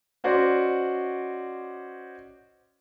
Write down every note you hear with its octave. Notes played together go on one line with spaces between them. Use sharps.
C#4 F#4 C5 D5 D#5